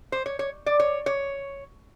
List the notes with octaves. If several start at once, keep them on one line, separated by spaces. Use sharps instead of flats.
C5
C#5
C#5
D5
C#5
C#5